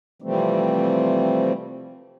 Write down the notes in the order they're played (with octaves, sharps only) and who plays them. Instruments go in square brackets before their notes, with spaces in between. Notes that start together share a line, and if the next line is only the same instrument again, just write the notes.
[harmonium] C3 E3 F3 G3 A3 C4